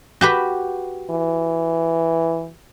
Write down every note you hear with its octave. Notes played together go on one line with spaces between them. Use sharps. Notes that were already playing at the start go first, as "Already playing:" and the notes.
F#4 G4 B4
E3